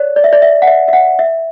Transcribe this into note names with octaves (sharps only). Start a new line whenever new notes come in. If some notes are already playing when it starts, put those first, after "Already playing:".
Already playing: C#5 D5
D5
E5
D5
E5
F#5
E5
E5
F#5
E5